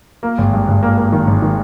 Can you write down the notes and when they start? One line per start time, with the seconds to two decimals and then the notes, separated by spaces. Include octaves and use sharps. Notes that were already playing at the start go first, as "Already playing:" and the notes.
0.23 A#3
0.38 G#1
0.53 G2
0.68 G#1
0.83 A#3
0.98 A#3
1.12 D#3
1.27 G#1
1.42 D#3